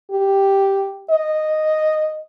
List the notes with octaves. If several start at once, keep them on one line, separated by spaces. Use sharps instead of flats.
G4
D#5